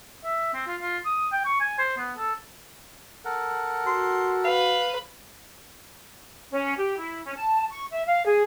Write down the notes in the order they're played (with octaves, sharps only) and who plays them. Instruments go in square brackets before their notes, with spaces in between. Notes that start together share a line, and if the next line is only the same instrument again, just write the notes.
[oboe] E5
C4
F4
F4
D#6
G5
C#6
G#5
C5
B3
A4
[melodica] A4 A#4 F#5
[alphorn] F#4 [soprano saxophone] C6
[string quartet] B4 [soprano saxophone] F5
[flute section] C#4
G4
E4
C#4
A5
C#6
E5
F5
G#4